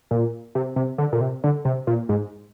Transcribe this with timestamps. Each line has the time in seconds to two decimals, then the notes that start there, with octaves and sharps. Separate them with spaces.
0.11 A#2
0.55 C3
0.76 C3
0.98 D3
1.13 A#2
1.21 C3
1.44 D3
1.65 C3
1.87 A#2
2.09 G#2